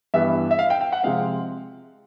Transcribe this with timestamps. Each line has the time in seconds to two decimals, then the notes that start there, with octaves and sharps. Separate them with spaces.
0.14 G2 E3 G3 B3 E5
0.51 E5
0.59 F5
0.70 G5
0.81 G5
0.92 F#5
1.03 C3 F3 G#3 C4 F5